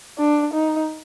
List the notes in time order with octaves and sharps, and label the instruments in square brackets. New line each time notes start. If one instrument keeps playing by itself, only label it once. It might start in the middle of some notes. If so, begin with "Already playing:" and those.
[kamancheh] D4
D#4